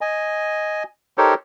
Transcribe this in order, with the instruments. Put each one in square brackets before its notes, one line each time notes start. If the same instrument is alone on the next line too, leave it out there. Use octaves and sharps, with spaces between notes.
[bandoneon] D#5 G#5
D#4 G4 A4 A#4 C5 C#5